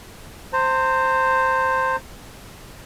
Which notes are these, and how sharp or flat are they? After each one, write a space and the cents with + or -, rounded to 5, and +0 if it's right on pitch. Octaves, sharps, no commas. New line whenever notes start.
C5 +0 A#5 -40